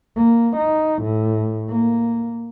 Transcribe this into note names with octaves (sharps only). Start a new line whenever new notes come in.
A#3
D#4
A2
A#3